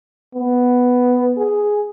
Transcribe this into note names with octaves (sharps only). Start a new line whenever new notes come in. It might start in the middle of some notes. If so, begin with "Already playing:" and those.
B3
G#4